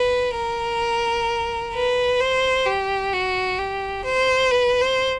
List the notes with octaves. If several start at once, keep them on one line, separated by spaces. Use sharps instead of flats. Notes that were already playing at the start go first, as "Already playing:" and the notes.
Already playing: B4
A#4
B4
C5
G4
F#4
G4
C5
B4
C5